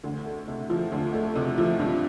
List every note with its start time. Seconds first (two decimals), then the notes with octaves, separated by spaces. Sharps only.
0.04 D2
0.26 A3
0.48 C3
0.70 F3
0.92 D2
1.14 A3
1.36 C3
1.58 F3
1.79 G2